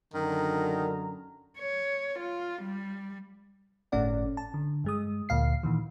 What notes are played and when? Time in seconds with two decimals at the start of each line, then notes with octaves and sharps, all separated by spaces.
0.14 F#2 D3 D#3 A#5
1.59 C#5
2.19 F4
2.63 G3
3.92 G1 A2 A3 C#4 D5 F#5
4.37 A5
4.54 D3
4.84 G2 G#3 D#6
5.29 D2 A#2 F5 C7
5.63 A#2 D#3 E3